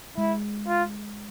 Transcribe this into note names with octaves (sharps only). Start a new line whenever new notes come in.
G#3 E4
F4